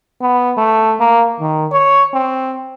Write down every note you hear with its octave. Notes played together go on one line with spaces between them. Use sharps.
B3
A3
A#3
D#3
C#5
C4